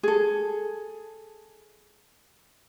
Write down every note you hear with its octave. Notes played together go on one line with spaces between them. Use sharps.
G#4 A4